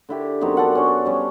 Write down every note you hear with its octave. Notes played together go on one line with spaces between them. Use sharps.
D3 E4 G4
F#2 B3 C4 D#4
D4 A4 F#5
C#4 D4
G3 C#4